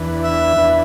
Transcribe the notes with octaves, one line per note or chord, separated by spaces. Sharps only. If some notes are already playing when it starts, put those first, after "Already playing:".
Already playing: E2 E3 D4 B4
E5
E2 E3 D4 B4